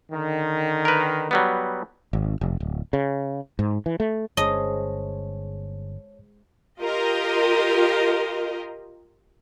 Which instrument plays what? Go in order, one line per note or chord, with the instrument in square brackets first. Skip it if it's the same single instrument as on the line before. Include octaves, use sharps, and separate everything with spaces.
[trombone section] D3 D#3
[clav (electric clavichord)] A#4 B4
F#3 G3 B3
[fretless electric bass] G#1
F1
D1
C#3
G#2
E3
A3
[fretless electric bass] G1 C#4 [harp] G#3 G#4 C5 [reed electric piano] C#5 A5 [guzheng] D#5
[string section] F4 G4 A#4 D#5